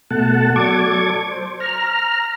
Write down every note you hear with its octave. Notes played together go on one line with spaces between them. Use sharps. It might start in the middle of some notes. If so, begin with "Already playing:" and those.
B2 A3 F#5 A5
F#3 A4 D5 C#6 D6 G#6
C5
A#5 F6